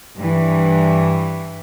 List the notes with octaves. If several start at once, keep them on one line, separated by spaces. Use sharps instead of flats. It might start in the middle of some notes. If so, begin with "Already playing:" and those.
G2 E3